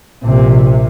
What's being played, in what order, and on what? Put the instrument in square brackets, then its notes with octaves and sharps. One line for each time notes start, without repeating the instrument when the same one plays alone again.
[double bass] A#1 C3